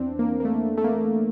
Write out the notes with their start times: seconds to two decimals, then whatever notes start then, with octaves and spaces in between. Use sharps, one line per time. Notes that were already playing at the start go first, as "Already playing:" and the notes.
Already playing: E2 E3 C4 D4
0.19 A#3
0.40 A#3
0.45 A3
0.77 A3
0.84 A#3